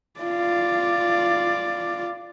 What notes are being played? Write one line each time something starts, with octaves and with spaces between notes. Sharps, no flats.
F4 D5